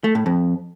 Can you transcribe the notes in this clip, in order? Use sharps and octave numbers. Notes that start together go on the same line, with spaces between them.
A3
A2
F2